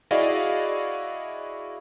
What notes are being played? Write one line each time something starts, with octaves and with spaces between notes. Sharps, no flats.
E4 F#4 G#4 D5 D#5 F5